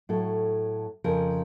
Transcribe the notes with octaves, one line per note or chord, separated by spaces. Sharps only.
A2 F#3 A4
F2 C#3 F3 A#4